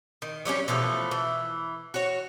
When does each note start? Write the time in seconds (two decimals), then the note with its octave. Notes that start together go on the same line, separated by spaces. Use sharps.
0.22 D#3
0.45 F#3 G3 A#3 C#4
0.68 B2 E3 F3 A3
1.11 E3
1.94 F#4 C#5